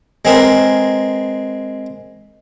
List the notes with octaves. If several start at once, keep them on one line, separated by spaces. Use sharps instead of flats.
G#3 C4 G#4 A#4 B4